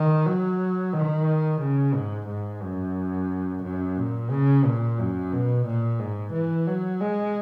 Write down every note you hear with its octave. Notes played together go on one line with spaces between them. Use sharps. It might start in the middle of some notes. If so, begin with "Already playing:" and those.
Already playing: D#3
F#3
D#3
C#3
G#2
G#2
F#2
F#2
A#2
C#3
A#2
F#2
B2
A#2
G#2
E3
F#3
G#3